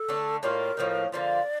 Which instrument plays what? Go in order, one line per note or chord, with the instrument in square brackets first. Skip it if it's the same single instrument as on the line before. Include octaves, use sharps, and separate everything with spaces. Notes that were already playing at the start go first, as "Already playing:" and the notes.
Already playing: [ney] A4
[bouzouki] D3 A3 D4
[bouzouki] A2 G3 A#3 F4 [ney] A#4
[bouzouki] A2 F3 A#3 D#4
[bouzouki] D3 F3 A#3 F4 [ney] D5